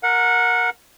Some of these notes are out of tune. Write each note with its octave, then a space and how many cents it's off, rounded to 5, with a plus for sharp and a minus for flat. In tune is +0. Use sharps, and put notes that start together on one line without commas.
A#4 +0 F#5 -20